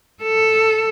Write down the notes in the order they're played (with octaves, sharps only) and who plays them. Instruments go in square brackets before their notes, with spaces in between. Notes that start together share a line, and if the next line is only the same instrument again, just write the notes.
[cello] A4